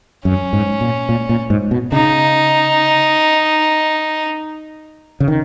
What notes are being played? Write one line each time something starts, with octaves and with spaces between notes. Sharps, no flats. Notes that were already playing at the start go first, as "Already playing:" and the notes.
F#2 C#4
G#2
A#2
A#2
A#2
G#2
B2
C#3 D#4
C#3
D#3